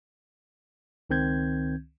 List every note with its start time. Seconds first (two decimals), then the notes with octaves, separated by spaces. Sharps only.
1.10 C#2 D#3 C4 G6 G#6